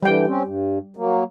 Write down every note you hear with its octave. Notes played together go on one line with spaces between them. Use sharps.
D3 E3 G3 G5
C4 C#4
G2
F#3 A#3